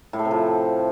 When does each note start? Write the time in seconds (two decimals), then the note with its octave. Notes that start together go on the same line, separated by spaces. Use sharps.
0.13 A2
0.19 A3
0.25 C3
0.31 F3